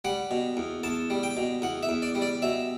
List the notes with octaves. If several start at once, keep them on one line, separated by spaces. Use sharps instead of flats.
G3 F#5
B2
E2
E2 A5
G3
G5
B2
E2 F#5
E5
E2
D5
G3
D5
B2 E5